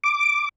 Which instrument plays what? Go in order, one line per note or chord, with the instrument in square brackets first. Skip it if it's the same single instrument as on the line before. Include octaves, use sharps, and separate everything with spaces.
[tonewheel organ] D6